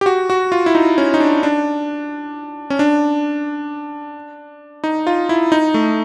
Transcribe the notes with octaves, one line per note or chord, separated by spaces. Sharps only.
G4
F#4
F#4
F4
E4
D#4
C#4
D#4
D4
D4
C#4
D4
D#4
F4
E4
D#4
A3